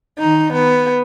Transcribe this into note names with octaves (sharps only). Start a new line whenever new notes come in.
D#3 D#4
B3